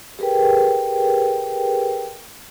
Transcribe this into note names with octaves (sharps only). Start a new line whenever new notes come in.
G4 G#4 A#4 B4 G5